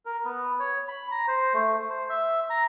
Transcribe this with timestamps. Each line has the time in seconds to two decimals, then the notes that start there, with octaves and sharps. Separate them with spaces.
0.05 A#4
0.25 B3
0.60 C#5
0.88 B5
1.11 A#5
1.28 C5
1.54 A3
1.90 C5
2.10 E5
2.50 A#5